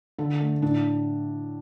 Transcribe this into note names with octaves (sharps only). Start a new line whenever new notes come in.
D3 A4
A3
A2 D4